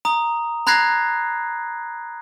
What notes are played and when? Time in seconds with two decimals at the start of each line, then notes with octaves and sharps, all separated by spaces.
0.05 A#5 D#6
0.67 A#5 B5 F#6 G#6 A#6 C7